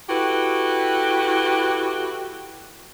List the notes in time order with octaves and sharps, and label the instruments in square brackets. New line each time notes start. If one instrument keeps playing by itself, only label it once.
[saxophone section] E4 F#4 G4 A4 B4